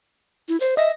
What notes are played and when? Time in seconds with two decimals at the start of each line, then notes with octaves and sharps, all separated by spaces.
0.49 E4
0.60 C5
0.77 D#5 E5 A#6